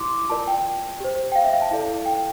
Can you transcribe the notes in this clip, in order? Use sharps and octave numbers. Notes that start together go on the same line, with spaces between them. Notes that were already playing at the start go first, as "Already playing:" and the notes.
Already playing: E4 G4 C6 D6
F4 A#4 D5 A5
G5
G4 C5
G5
F5
E5
F5
A5
E4 A4 D5 F5
G5